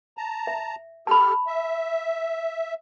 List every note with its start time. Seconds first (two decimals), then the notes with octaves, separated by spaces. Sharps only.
0.17 A5 A#5
0.47 E5
1.07 G4 A4 A5 B5 F6
1.47 E5